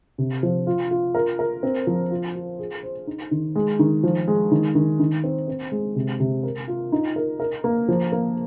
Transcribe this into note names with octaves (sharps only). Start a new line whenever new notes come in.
C3
F3
F4
F4
A#4
A#4
C4
F3
F4
F4
G#4
C5
D#4
D#3
G#3
D#3
F3
G#3
D#3
D#3
D#3
C4
C4
G#3
C3
C3
A#4
F4
D#4
A#4
A#4
A#3
F3
A#3